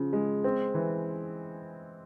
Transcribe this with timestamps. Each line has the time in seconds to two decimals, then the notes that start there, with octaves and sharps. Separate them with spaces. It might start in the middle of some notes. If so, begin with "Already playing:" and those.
Already playing: C#3 F3
0.13 G#3
0.44 C4
0.74 E3